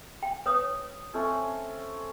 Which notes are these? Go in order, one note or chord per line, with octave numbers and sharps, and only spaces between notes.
G5
B4 C#5 D#6
A3 C4 C#4